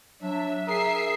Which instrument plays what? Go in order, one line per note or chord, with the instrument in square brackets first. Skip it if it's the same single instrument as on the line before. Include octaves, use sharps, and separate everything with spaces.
[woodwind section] F#3 D4 [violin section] E5
[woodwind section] G#4 D#6 [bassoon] A#4 [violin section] E5 C7